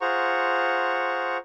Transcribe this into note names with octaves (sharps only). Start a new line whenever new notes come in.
F4 G#4 C5 F#5 A#5 C#6